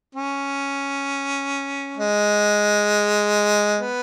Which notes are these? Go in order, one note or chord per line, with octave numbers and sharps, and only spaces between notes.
C#4
G#3
B3